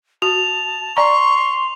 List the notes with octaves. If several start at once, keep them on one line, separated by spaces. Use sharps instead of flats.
F#4 A5 F7
D5 A#5 C6 C#6